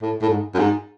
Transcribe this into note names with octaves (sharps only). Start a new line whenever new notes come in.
A2
A2
G#2
F#2
G#2